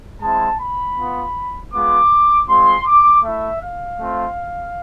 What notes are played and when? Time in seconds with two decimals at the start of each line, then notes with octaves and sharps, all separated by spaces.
0.21 G#3 C4 E4 A5
0.59 B5
0.98 B3 F4
1.73 G#3 B3 F4 D6
2.49 G#3 C4 F4 C6
2.86 D6
3.23 A3 E4 E5
3.61 F5
3.99 A3 C4 F4